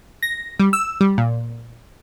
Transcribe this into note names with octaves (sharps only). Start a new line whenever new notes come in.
A#6
G3
E6
G3
A#2